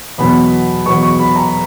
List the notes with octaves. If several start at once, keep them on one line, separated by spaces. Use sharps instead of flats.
E2 B2 F#3 B5
E2 B2 F#3 C#6
C#6
B5
A#5